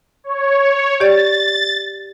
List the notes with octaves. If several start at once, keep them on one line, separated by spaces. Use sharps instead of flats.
C#5
G4 D5 A6